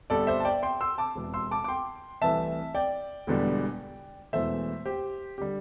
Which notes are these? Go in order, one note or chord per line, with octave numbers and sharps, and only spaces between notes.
G1 G2 G3 A4 D5
C5 E5
A5
D5 G5
G5 C6
C6 E6
A5 D6
E1 E2 C3
C6 E6
A5 D6
D6
G5 C6
C2 C3 E3 A3 E5 A5
D5 G5
E1 E2 D3 G3
E1 E2 E3 A3 C5 E5
G4 C5
D3 G3 G4